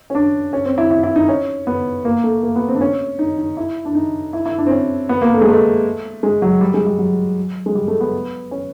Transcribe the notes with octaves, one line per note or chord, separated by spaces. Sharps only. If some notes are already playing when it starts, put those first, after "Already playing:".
C#4
D4
C#4
C4
E4
E4
E4
D#4
C#4
B3
A#3
A3
A#3
B3
C4
D4
C#4
D#4
D#4
E4
D4
D#4
E4
E4
D4
C4
C#4
B3
A#3
A3
G#3
A3
G#3
F#3
G3
G#3
G3
F#3
G#3
G3
A3
B3
C#4